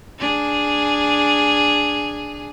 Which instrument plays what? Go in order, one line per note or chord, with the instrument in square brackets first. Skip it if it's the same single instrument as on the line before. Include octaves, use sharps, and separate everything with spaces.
[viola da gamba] D4 G#4